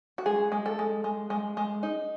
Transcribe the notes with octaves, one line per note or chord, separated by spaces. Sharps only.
F#4
G#3 G#4
G#3
A4
G#3
G#3
G#3
G#3
D#4